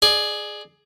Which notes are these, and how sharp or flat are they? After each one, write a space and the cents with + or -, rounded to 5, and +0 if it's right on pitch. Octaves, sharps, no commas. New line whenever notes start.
G#4 +10 D5 +30